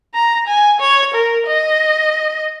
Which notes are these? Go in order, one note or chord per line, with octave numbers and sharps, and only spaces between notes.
A#5
G#5
C#5
A#4
D#5